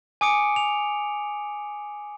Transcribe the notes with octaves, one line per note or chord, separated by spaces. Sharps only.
G#5 D6 D#6 C#7 D7
F7